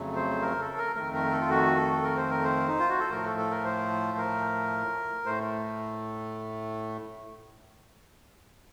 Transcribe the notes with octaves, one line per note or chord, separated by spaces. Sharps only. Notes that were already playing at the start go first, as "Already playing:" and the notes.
Already playing: F2 C#3 F#3 A3
C5
A#4
A4
A#4
F2 D#3 A3 A#4
A#4
A4
F4
F#4
A4
A#4
C5
A#4
C5
D#4
F4
F#4
A4
A2 F3 A3 A#4
A4
A4
A#4
C5
A#4
A2 A3 C5